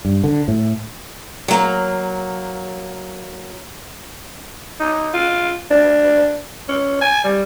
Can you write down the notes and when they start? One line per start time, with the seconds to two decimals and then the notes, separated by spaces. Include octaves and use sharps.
0.05 G2
0.24 D3
0.48 A2
1.48 F#3 A#3
4.80 D#4
5.14 F4
5.71 D4
6.69 C#4
7.01 G#5
7.24 G3